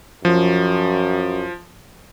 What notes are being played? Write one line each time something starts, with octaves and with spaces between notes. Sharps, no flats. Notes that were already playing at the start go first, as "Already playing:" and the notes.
F#2 F3